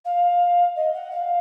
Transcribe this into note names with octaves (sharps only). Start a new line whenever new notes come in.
F5
D#5
F#5
F5